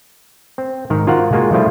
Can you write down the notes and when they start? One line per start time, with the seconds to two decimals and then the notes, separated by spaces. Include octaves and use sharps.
0.58 C4
0.90 G#2 D#3 A#4
1.07 F4 F#4 A#4 C5 F5 F#5
1.33 G#3 A#3 F4 F#4
1.52 F3 G3 A3 C4 E4 F4